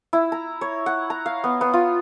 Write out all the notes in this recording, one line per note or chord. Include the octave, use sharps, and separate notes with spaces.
E4
A#5
C#5
F#5
A#5
F5
B3
B3
F4